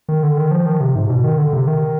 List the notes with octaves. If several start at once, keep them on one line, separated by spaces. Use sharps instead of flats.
D#3
D3
D#3
F3
D#3
C3
G#2
B2
D#3
D3
C3
D#3